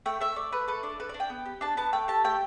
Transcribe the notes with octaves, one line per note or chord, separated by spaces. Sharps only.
A3 G5
A3 E5
A3 D5
A3 B4
A4 B4
D4 D5
A4 B4
D5
D4
G5
B3
G4
D4 A5
B3 A5
A3 G5
G4 A5
A3 G5